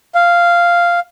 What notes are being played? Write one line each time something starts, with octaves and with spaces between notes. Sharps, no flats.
F5